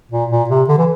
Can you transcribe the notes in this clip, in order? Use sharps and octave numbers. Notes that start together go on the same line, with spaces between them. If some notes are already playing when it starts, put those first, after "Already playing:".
A#2
A#2
C3
D3
E3